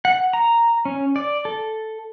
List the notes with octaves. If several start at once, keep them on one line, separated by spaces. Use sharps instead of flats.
F#5
A#5
C#4
D5
A4